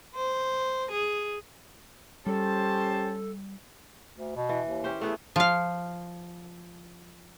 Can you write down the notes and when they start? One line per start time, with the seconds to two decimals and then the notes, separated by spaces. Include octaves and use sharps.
0.16 C5
0.91 G#4
2.26 G3 C#4 G4 A4 C5 A5
4.17 D2
4.36 B2
4.49 E3
4.66 D#2
4.84 C#4 G4 C5
5.01 A3 B3 E4 G#4
5.36 F3 F5